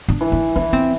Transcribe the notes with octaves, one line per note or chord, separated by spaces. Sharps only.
D4
E3
D4
E3 D4
C4